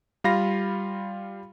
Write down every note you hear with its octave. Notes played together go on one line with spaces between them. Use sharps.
G3 F4 F5 B5 A#6